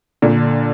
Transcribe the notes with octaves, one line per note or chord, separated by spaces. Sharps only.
A#2 D3